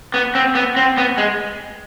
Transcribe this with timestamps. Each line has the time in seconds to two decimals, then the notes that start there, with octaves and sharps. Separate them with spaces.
0.14 B3
0.35 C4
0.55 B3
0.77 C4
0.98 B3
1.18 G#3